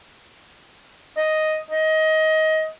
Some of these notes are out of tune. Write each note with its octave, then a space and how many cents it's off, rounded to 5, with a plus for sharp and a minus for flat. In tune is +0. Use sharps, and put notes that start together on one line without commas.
D#5 +0
D#5 +20